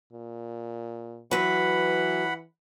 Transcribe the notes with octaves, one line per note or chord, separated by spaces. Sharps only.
A#2
E3 F#3 B4 F#5 B5